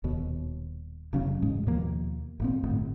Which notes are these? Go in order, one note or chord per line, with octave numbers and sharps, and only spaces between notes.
D#1 D#2 B2
F1 C#3 F#3 C#4
A1 G#2 G#3
D#2 B2 F3 A#3
G#1 A#2 C4
G1 A2